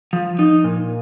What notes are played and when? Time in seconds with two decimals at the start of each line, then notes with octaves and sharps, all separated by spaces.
0.13 F3
0.39 D#4
0.64 A#2